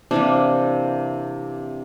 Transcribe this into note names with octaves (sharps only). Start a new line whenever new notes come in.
C3 E3 G3 A#3 D4